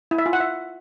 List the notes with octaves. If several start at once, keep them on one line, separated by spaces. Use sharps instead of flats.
E4
E5
F4
F#5
E5